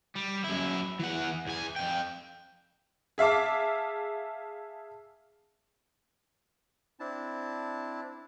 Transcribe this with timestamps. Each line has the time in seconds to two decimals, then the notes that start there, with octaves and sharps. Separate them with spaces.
0.15 G3
0.44 F#2 E4
0.99 E3 F#5
1.47 E2 G#5
1.76 F2 G5
3.18 G#4 E5 F5 A5 D6
7.00 C4 D4 E4 A5